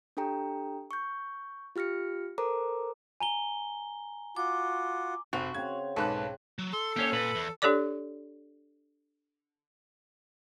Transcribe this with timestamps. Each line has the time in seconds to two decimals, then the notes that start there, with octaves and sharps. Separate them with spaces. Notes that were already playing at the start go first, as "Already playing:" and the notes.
0.17 D4 G4 A4 G5 A#5
0.91 C#6 G6
1.76 F4 G4 F6 A#6 C#7
2.38 A4 A#4 C5 A#5 D6
3.20 G#5 A#5 G7
4.36 F4 F#4 D6
5.33 F1 C4 F#4 F7
5.54 C#3 C4 G#6
5.96 B1 G#2 A4 B4 F#6
6.59 F#3
6.73 A4 C6
6.96 A#3 C#4 G4 C#5
7.13 A#2 B4
7.35 E2
7.62 D4 G4 A4 C#5 D5 D6